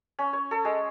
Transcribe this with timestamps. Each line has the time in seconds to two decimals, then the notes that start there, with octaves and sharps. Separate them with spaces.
0.19 C#4
0.33 C#5
0.51 A4
0.65 G#3